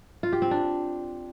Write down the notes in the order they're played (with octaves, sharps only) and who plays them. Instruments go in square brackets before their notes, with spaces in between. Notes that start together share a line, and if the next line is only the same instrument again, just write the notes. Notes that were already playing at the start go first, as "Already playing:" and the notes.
[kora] F4
G4
C4
D4